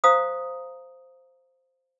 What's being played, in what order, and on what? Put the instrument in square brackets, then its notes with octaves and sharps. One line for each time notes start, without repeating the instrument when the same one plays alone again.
[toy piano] C5 F5 A#5 D#6